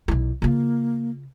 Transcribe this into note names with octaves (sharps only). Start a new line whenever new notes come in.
B1 E4
C#3 A#3 F4